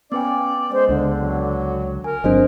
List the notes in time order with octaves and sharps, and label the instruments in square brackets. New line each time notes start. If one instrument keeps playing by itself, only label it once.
[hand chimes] B3 B4 G5 [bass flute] C#4 [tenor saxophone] D5
[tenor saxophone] G#3 [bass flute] C5
[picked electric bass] C#2 [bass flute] D3
[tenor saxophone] F#3
[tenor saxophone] A#4 [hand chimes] G#5
[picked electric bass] G1 F#3 C4 [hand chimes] D4 C5 D#5